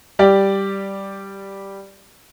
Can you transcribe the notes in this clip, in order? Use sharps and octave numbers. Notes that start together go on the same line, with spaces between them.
G3 G4 D5